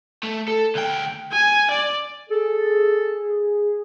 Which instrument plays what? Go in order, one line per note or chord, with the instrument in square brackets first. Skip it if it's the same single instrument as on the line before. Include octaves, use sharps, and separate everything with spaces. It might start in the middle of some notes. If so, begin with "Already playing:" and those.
[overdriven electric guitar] A3
A4
D2 G5
[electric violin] G#5
D5
[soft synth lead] G#4 [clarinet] A4